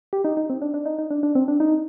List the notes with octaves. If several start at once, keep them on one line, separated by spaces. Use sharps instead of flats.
G4
D#4
D#4
C4
D4
D4
D#4
D#4
D4
D4
C4
D4
D#4